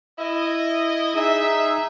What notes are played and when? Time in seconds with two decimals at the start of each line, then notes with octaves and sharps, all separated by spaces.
0.19 E4 D#5
1.15 D#4 G#4 E5